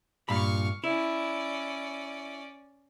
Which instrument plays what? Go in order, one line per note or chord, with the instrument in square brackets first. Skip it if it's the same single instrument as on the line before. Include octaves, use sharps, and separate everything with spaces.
[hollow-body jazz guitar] G2 A#2 B5 [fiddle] F5 C#6
[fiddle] C#4 D5 [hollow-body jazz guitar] E4